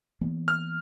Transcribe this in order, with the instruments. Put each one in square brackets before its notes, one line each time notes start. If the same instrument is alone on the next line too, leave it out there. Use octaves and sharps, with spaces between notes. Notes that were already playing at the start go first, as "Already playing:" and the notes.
[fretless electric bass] E3 A#3 B3
[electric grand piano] F6